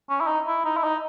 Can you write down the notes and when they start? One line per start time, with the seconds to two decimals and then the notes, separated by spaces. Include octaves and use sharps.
0.10 C#4
0.21 E4
0.28 D#4
0.47 E4
0.65 D#4
0.77 E4
0.84 D#4